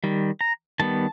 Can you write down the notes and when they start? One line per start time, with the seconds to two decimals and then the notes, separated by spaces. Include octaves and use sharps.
0.04 D#3 G3
0.41 A#5
0.80 D#3 G3 B3 A5